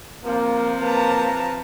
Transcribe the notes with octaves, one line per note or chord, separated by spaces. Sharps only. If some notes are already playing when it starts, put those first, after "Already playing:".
C3 F3 A#3
A#3 B4 A5 A#5